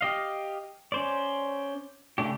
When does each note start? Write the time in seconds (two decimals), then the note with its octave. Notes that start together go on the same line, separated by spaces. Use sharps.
0.01 G4 D#5 F5
0.92 C#4 C5 D5
2.18 C#3 A3 D4 G4